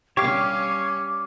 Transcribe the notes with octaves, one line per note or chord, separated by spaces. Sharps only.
G3 C#4 G4 C#5 F5 D6